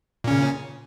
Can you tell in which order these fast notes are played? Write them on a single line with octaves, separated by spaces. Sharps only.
A#2 C#4 C#3